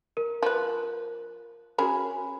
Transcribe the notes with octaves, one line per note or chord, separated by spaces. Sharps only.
A#4
F3 B4
C#4 F#4 G#4 A#4 A#5 B5